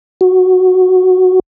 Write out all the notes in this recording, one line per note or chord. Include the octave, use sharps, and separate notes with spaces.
F#4